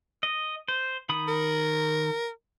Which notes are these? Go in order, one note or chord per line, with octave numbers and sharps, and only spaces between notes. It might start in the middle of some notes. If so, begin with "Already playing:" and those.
D#5
C5
D#3 B5 D#6
A#4